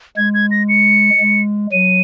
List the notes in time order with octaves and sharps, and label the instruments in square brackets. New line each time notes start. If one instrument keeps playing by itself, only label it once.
[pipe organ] G#3 [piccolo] G#6
[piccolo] G#6
A#6
C#7
[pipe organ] G#3
[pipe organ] F#3 [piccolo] D#7